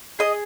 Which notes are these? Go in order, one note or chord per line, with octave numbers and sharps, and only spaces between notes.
G#4 D#5